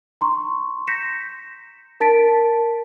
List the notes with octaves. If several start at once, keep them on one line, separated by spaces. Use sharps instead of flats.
A#5 C6 C#6
G6 A#6 B6 C#7 E7
A#4 A5 A6 B6 D7